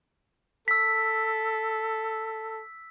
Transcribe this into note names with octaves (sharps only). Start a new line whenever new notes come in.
A4 E6 B6